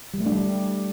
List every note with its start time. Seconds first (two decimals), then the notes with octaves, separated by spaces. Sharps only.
0.14 G3
0.20 A3
0.26 D4
0.32 G3